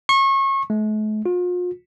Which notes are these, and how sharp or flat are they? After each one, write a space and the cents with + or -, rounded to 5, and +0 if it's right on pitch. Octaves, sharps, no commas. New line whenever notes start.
C#6 -30
A3 -45
F4 +40